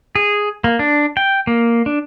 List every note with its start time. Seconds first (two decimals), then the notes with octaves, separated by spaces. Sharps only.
0.15 G#4
0.64 A#3
0.79 D4
1.17 G5
1.47 A#3
1.86 D4